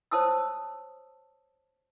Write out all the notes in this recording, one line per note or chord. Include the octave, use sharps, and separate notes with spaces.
C5 C#5 A5 D#6 E6